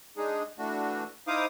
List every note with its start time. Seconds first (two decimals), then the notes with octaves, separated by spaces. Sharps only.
0.17 G#3 D4 D#4 G#4
0.59 E3 A3 D4 F#4
1.27 D#4 E4 C5 F5 D6 D#6